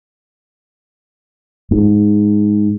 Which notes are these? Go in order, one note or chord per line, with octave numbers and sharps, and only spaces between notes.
G#2